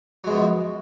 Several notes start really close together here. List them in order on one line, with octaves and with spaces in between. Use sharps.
F#3 G#3 B2 F#2 F3